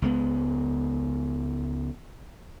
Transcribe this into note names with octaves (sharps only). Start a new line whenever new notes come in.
C#2 G#3 B3